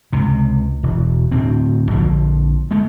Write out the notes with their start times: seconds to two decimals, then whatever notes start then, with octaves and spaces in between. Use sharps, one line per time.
0.13 C#2 C3
0.83 E1
1.32 D1 D2 C4
1.92 A#1 D3 F3
2.71 G#3 A3